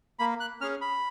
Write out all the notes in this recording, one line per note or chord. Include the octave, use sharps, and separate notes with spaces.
A#3 B5
F#6
C#4 G#4 F6
B5